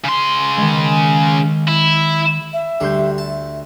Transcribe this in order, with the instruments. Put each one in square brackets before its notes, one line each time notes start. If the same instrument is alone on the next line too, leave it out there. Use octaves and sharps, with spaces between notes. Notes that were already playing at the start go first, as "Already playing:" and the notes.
[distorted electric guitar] C#3 C6
[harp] D#3 G#3
[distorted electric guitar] E4
[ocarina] E5
[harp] D2 C6 G6 [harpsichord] G3
[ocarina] E5 [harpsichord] A5